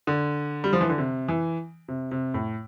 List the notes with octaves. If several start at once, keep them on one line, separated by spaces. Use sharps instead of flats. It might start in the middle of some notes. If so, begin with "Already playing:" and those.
D3
G3
F3
E3
D3
C3
E3
C3
C3
A2